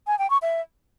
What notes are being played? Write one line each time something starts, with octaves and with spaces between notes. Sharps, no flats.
G#5
G5
C#6
E5